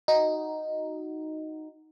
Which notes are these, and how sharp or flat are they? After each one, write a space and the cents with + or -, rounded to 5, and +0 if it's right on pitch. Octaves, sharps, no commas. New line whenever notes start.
D#4 +0 F#4 +0